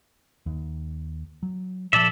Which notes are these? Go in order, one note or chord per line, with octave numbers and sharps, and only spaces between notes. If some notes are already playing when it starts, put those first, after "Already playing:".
D#2
F#3
A#2 F3 A4 D5 E5